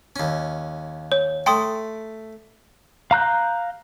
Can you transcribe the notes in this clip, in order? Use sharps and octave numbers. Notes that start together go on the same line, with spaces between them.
D#2 C#4
C#5
A3 G5 C6 D#6
F5 A#5 F#6 G6